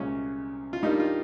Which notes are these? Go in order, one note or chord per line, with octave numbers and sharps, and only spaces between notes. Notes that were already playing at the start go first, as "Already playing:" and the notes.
Already playing: C2 A#2 G#3 C#4
F4
G2 G3 A#3 D#4
F4